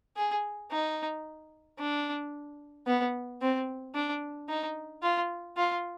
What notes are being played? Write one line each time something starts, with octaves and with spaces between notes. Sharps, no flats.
G#4
D#4
D4
B3
C4
D4
D#4
F4
F4